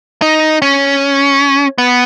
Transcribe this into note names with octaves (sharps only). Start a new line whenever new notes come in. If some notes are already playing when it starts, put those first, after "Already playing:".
D#4
C#4
B3